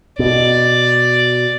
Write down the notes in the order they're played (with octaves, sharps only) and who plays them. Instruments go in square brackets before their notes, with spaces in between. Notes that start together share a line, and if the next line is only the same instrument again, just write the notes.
[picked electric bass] B2 [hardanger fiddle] D5